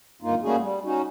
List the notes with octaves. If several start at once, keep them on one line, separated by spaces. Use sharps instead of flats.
D2 G2 A#3 D#4 F4
G3 A3 A#3 C#4 F#4 G#4
G3
C#4 D#4 F#4